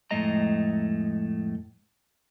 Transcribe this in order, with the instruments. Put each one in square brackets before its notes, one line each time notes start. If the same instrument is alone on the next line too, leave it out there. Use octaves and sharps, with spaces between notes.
[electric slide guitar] F2 A2 G#3 A3 D#5 A#5